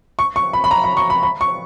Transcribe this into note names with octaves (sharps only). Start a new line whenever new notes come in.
C#6
C#6
B5
B5
A#5
B5
C#6
B5
B5
C#6